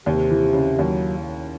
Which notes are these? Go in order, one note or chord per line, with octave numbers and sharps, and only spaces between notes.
D#2 C3
E3
C#3
D#2 F#3